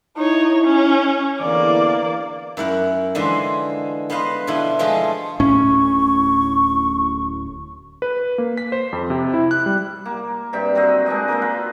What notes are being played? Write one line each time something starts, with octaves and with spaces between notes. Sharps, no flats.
D#4 E4 C#5
C#4
E2 D3 E3 A#3 D5
F#2 E4 A#4 F#5
D3 E3 F3 G#3 C5 E5
B3 B4 C5 D#5 F5
B2 D3 F3 E4
B2 F3 G#3 A3 G#4 A4
D1 A2 C#4 C#6
B4
A#3
B6
C5
F2
C3
E4
F#6
G3
A#3
G2 C3 G5
F#3 C4 F#4 D#5
G#3 C4 D4 D#5
A#3 A#4 C5 D#5
F4 B4